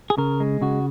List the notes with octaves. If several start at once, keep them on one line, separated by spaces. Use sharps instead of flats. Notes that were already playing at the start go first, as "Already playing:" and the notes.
G#4
C#3 A#4
G#3
C#3 F#4